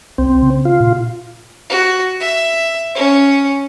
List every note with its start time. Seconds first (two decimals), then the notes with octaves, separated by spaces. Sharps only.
0.18 C2 C4
0.42 C#3
0.65 F4
0.80 A#2
1.69 F#4
2.20 E5
2.95 C#4